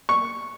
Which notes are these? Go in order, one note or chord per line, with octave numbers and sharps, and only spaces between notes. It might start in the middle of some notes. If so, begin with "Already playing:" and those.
C#6